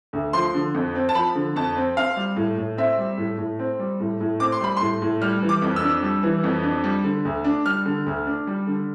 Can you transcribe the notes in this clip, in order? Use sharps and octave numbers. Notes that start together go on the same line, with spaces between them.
D2
F3 C6
D3
F2
C4
A5
F3 B5
D3
F2 A5
C4
C4 F5
G3
A2
A2
C4 E5
G3
A2
A2
C4
G3
A2
A2
C4 D6
C6
G3 B5
A2 C6
A2
G3 F6
E3
D6
F2
E6
D4
G3
E3
F2
D4
G3
D3
D2
D4
G3 F6
D3
D2
D4
G3
D3